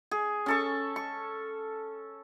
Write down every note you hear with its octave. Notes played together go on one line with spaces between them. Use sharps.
G#4
C#4 A4 C#6
C#6